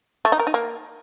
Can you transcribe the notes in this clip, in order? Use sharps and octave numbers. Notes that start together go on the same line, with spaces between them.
A3
D#4
A#4
D#4
A#3